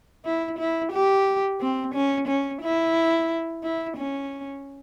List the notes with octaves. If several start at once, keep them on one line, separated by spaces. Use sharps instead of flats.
E4
E4
G4
C4
C#4
C#4
E4
E4
C#4